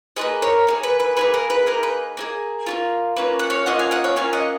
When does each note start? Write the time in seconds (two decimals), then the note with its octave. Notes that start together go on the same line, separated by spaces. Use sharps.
0.16 A#3 F4 G#4 B4 D#5
0.42 A#4 C#5
0.67 A#3 D#4 G#4
0.83 B4
1.00 B4
1.17 A#3 D#4 G#4 B4
1.34 A#4
1.50 B4
1.66 A#3 D#4 G#4 A#4
1.83 B4
2.17 A#3 D#4 G#4
2.66 A#3 C#4 F4
3.16 A#3 C#4 F4 B4
3.39 F#5
3.50 C#5 F5
3.66 A#3 C#4 F4 D#5 F#5
3.79 F5 G#5
3.91 D#5 F#5
4.04 C#5 F5
4.16 A#3 C#4 F4 F5 G#5
4.33 D#5 F#5